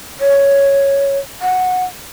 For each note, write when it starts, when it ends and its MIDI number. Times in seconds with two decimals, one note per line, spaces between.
0.20 1.18 73
1.42 1.85 78